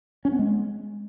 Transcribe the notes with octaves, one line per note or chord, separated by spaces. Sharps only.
C#4
B3
G#3